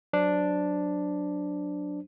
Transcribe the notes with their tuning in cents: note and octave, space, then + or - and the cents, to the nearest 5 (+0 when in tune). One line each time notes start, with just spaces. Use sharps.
F#3 +0 D4 +0 C5 +0